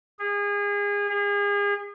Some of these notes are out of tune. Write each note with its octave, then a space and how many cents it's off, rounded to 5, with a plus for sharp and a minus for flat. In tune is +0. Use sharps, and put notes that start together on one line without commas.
G#4 -30
G#4 -35